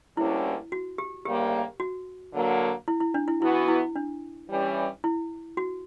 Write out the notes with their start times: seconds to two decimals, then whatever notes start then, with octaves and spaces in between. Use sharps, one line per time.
0.17 D2 D3 G3 A#3 C#4 E4
0.72 F#4
0.98 G4
1.25 D2 C#3 G3 A#3 G4
1.80 F#4
2.34 D3 F#3 A#3
2.88 E4
3.00 E4
3.14 D4
3.28 E4
3.41 E3 B3 E4 F#4
3.68 E4
3.96 D4
4.49 E3 G3 C#4
5.04 E4
5.57 F#4